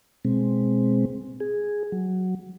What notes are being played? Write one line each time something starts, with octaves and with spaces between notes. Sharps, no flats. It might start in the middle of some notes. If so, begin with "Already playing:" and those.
B2 G#3 C4
G#4
F#3